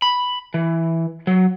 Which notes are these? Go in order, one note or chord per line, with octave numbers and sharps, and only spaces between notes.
B5
E3
F#3